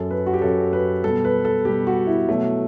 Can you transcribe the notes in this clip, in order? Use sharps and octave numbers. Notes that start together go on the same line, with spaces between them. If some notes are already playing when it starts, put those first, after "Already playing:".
Already playing: F#2 F#3 A4
B4
F#4
G4
F#2 F#3 A4
B4
B2 G3 A4
B4
A4
B2 G3 G4
F#4
E4
B2 F#3 A3